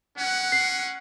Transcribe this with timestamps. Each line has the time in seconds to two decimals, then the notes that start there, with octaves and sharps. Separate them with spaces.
0.18 C#4 F#5 F#6
0.52 C7